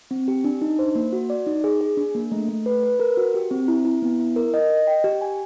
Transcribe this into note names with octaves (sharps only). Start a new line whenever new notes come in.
C4
G4
D4
D#4
C5
A#3
F#4
D5
D#4
G#4
G#4
D4
A#3
A3
A3
B4
B4
A#4
F#4
G4
C4
E4
E4
B3
E4
A#4
D#5
D#5
G5
G4
G#5